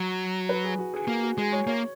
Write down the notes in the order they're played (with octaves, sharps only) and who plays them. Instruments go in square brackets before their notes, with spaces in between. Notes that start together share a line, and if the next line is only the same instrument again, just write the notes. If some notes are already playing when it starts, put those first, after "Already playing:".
Already playing: [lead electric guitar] F#3 [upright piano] A#5
[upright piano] B4
G#4
F#4
G#4
[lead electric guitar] A#3 [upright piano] F#4
[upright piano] F#4
[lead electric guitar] G#3 [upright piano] G#4
[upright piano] C#5
[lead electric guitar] A#3 [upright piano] C#5